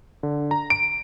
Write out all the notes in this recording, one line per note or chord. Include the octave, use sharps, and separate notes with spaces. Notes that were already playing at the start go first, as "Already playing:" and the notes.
D3
A#5
D7